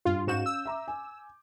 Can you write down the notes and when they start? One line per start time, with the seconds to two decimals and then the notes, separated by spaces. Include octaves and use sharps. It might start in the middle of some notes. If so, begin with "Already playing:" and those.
0.05 G2 G3 F4
0.27 G#2 C#4 F#4 F5 G6 E7
0.46 E6
0.65 E5 A#5 D6
0.88 G#5